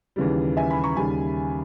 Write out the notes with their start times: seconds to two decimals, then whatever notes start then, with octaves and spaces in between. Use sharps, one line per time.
0.16 D#2 C#3 E3 G3
0.57 E5 G#5
0.70 G#5 B5
0.84 A#5 C#6
0.96 D#2 C#3 G3 G#5 B5